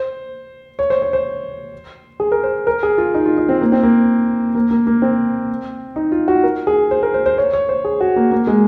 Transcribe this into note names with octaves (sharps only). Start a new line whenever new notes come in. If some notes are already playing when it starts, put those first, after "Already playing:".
Already playing: C5
C#5
C5
C#5
C5
G#4
A#4
C5
A#4
G#4
F4
D#4
F4
D#4
C4
A#3
C4
A#3
A#3
A#3
A#3
C4
D#4
F4
F#4
A#4
G#4
C5
A#4
C5
C5
C#5
C#5
C5
G#4
F#4
A#3
A#3
G#3